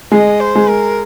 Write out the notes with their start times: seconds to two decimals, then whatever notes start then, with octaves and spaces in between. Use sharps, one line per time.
0.12 G#3 D#5
0.40 C5
0.55 G#3
0.69 A#4